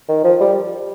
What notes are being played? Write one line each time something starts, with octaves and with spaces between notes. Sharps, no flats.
D#3
F3
G3